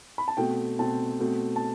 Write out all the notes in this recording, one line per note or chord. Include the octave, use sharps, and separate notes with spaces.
B5
A5
B2 A3 C4 G5
B2 A3 C4 A5
B2 A3 C4
A5